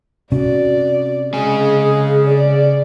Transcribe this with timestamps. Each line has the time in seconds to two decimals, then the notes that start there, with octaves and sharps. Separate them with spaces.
0.32 C3 C#4 F#4 D5
1.34 C#3 G#3 G#4 G#5
2.27 D5